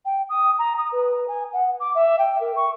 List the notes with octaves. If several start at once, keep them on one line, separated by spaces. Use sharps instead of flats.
G5
D#6
A#5
D#6
B4
G#5
F#5
D6
E5
G5
A#4
C#6